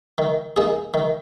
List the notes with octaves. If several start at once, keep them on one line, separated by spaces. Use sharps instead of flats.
D#3
A#3 D#4 G#4
D#3